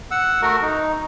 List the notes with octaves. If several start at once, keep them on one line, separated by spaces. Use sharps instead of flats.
F#5 E6
A3 F#4 A#4
D#4